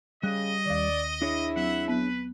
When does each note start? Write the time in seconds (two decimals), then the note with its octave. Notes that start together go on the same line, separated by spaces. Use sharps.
0.23 C#3 G3 D#5 F#6
0.66 D#2 D#3 D5
1.22 D4 E4 G#4 C#5
1.56 F#3 C4 E5 F#5
1.88 F#3 B3 B4